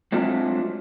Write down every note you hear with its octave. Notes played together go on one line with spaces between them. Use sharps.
F#3 G#3 A3 C4 D4 F4